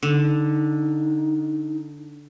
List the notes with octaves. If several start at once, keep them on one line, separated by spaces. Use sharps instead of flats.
D3 D#4